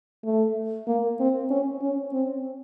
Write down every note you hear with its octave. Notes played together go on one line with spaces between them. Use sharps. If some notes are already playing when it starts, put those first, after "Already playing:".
A3
A#3
C4
C#4
C#4
C4